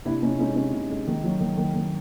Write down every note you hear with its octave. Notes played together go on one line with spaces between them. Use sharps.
C3 D4 E4
C3 C#4 D#4
G#3 C#4 D#4
C3 C#4 D#4
C3
G#3
D#3
F#3
D#3
D#3
D#3